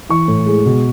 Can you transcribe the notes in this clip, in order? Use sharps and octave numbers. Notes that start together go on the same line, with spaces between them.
E3 C#6
A2
G#3
B2